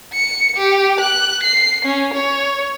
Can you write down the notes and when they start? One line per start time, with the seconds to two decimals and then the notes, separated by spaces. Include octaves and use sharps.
0.13 C#7
0.57 G4
1.01 F#6
1.44 C7
1.85 C#4
2.14 C#5